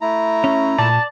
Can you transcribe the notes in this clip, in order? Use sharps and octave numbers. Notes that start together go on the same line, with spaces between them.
A3 E4 A#5
C#4
A#2 D5 A5